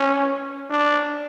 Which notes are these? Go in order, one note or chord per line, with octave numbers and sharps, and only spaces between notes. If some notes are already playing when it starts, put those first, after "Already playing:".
Already playing: C#4
D4